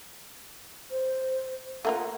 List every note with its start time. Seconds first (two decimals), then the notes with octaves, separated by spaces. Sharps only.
0.91 C5
1.85 A3 A#3 F4 F#5